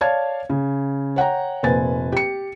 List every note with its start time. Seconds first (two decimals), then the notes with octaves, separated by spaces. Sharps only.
0.01 C#5 D5 F5 A5 G#6
0.50 C#3
1.16 C#5 F#5 G5 A#5
1.63 F1 A#2 B4 C5 G#5 A6
2.12 G4 C#7